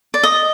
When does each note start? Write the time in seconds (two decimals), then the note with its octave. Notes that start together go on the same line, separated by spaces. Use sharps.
0.14 D5
0.23 D#5